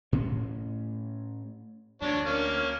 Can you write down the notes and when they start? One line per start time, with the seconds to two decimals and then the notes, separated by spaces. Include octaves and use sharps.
0.12 A2 C#4
2.02 D2 D4 C#5
2.26 A#3 C#4